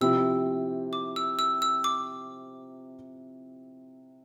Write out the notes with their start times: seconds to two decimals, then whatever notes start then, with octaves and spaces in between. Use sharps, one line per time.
0.01 C3 F3 C4 E4 E6
0.93 D6
1.16 E6
1.39 E6
1.62 E6
1.84 D6